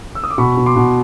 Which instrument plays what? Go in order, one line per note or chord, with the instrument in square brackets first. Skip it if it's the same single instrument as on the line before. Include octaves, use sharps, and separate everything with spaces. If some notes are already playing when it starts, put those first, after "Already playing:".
[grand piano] E6
D#6
D6
B2 B5 C#6
B2
C6 D6
B2